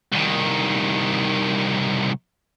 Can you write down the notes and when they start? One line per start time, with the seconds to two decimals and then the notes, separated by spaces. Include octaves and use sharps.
0.12 C2 D#3